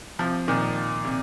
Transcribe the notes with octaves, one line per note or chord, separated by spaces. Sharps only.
C3 F3
A#2 D#3
C3